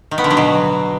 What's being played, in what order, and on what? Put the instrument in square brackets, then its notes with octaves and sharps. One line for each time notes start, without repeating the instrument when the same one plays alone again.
[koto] D#3
B3
D3
F#3
B2